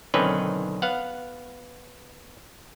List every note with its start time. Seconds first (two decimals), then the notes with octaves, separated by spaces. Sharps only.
0.14 B1 D3 D#3 C4 C#4 B4
0.82 B3 F5 F#5